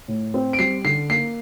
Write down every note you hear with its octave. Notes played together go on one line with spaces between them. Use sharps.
A2
C4
D7
G3 C7
D3 C7
A#3 C7